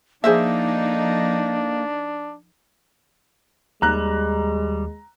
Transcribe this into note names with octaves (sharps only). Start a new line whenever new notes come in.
F3 A#3 D4 D#4 G#4 A4 C5 E5
D#2 G3 G#3 A#5 F#6